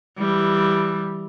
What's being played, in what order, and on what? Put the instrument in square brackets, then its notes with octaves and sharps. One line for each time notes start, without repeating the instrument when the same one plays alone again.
[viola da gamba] E3 G3